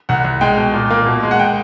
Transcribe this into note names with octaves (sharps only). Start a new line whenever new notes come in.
C2 F#5
C2
G#3 G5
B2
A#2
A#3
B2
G#3
F#5
G5